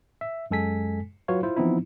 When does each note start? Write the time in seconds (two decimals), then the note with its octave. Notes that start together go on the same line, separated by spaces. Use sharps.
0.21 E5
0.51 F#2 G#3 A4 G#5 B6
1.28 F#3 F4 F#4 B4 C#5 F5
1.43 E4 F4 C5
1.57 E3 F3 B3 C4 D#4 E4